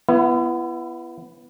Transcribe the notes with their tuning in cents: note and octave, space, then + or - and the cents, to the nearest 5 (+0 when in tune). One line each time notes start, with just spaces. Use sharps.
B3 +0 E4 +35